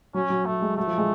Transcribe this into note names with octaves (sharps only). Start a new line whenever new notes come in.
F#3 C#4
F#3
F#3 A3
G#3
F#3 A3
F3
G#3